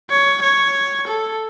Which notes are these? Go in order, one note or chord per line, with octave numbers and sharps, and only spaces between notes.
C#5
C#5
A4